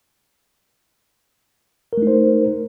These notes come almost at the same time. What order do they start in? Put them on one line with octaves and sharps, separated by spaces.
A#4 A3 D#4 C5